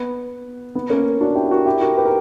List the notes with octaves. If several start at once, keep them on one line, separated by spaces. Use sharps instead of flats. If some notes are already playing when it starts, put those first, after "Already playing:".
Already playing: B3
B3
A#3 C#4
D4 F#4
E4 G4
F#4 A#4
E4 G4
F#4 A#4
G4 B4
A#4